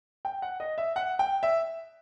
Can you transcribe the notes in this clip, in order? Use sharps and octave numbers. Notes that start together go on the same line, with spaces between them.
G5
F#5
D#5
E5
F#5
G5
E5